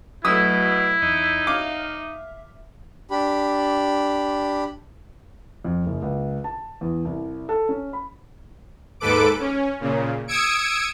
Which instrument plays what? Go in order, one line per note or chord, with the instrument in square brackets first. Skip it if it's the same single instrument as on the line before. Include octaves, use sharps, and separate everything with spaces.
[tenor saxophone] B2 [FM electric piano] F#3 A3 [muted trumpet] E4 [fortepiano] D#6 E6
[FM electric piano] E2 [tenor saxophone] D#4
[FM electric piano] E5 [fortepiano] F5 D6
[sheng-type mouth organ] D4 G4 B5
[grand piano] F2
F#1
C#2
A5
E2
C2
A4
C#4
B5
[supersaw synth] D#2 G#2 A4 B4 D6 D7
C#4
A#2 C#3
D#6 E6 G#6 C#7 D7